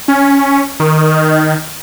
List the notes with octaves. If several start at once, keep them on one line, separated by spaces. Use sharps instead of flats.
C#4
D#3